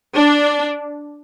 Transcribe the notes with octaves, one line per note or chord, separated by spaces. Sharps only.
D4